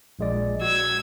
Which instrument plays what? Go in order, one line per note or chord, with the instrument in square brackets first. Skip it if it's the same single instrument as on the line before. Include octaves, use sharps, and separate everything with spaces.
[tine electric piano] A#1 G#3 D5
[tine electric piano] F#4 [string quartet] E6 G#6